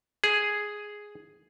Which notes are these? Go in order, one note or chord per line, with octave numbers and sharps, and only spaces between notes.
G#4